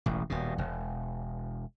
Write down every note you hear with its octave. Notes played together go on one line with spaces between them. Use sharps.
E1 A1
D#1 B2
E1